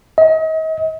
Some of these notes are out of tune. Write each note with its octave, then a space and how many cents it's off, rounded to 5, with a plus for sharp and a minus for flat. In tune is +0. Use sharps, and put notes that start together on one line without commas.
D#5 +40